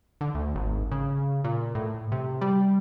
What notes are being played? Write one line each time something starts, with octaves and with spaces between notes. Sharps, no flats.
D3
D2
G#1
C#3
A#2
A2
C3
G3